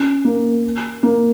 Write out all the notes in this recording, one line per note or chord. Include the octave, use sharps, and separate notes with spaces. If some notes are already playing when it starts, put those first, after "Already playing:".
Already playing: C#4
A#3
A#3